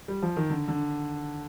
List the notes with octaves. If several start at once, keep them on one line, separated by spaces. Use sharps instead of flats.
G3
F3
D#3
D3
D3